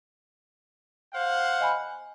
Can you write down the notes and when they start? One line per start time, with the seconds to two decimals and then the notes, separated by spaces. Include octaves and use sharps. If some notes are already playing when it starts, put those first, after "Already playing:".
1.13 C5 F5 F#5
1.60 D#5 G#5 B5